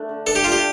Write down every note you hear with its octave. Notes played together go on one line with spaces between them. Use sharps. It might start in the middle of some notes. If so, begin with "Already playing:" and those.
Already playing: A3 D4
D3
D4 A4
G4
A3 F4
G4